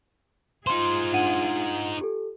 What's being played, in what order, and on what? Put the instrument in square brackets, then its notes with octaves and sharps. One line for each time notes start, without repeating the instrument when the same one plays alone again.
[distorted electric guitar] D#4 C5 [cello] F4 G#4 [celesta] C6
[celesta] D4 F#5 D#7
G4 A4